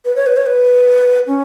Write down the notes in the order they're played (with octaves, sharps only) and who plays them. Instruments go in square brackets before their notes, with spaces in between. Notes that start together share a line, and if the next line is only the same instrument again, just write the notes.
[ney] B4
C#5
B4
C#5
B4
C#4